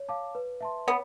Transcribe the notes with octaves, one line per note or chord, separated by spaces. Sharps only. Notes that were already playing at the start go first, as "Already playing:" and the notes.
Already playing: C#5
F5 A5 D6
B4
E5 A5 C6
B3 C#5